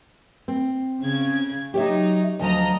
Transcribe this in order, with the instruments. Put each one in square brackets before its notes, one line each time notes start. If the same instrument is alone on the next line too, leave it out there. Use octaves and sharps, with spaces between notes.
[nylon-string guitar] C4
[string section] C#3 G#6
[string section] F#3 D#4 [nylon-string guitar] G4 C#5 E5
[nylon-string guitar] D2 F3 [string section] F#3 D#5 A#5